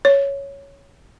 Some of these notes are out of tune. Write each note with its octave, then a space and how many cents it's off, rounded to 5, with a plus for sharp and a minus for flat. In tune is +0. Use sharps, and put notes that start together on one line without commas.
C#5 +5